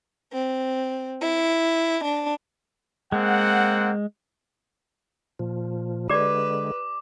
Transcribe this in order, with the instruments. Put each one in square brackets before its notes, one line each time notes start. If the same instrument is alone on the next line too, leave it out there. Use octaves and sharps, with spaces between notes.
[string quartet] C4
E4
D4
[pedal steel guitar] G#3 [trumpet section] A#3 C4 F#5
[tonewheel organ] A#2 F3
[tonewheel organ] D3 G#3 [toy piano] G4 D5 [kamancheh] B4 [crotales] D6